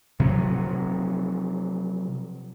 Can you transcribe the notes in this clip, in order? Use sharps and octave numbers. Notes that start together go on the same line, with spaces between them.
C3 F3 F#3